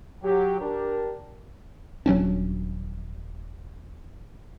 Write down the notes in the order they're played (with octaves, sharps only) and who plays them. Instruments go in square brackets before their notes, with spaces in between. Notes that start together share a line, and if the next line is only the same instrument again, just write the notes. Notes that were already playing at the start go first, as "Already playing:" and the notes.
[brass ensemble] F#3 G4
D4 G4 A#4
[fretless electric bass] D#1 F#3 C#4 D4